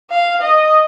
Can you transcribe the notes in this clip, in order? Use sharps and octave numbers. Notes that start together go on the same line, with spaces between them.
F5
D#5